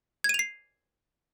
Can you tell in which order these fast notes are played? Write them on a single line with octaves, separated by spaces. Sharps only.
G#6 D#7 F7 C7